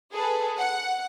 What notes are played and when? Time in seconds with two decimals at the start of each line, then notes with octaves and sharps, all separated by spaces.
0.14 G#4 A4 B4
0.57 F#5